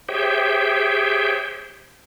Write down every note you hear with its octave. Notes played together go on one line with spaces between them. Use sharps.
G4 G#4 C5 C#5 E5 G5